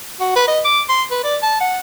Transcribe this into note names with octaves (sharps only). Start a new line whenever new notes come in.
F#4
B4
D#5
D6
C6
B4
D5
A5
F#5